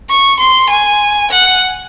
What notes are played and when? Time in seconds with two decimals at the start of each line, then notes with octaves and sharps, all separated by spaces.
0.10 C#6
0.40 C6
0.70 G#5
1.31 F#5